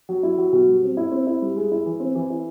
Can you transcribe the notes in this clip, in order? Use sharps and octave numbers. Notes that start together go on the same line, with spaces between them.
F#3
E4
F#3
B2
G3
C4
E4
C4
E4
G3
G#3
E4
E3
C4
E3
E4